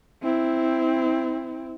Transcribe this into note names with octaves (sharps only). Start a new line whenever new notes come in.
C4 E4